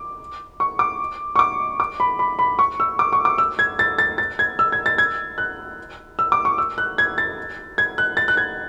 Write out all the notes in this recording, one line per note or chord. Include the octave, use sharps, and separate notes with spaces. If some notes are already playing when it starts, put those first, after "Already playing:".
Already playing: D6
C#6
D6
C#6
D6
D6
B5
B5
B5
C#6
E6
D6
C#6
D6
E6
G#6
A6
A6
A6
G#6
E6
G#6
A6
G#6
F#6
E6
D6
C#6
E6
F#6
G#6
A6
G#6
F#6
A6
F#6
G#6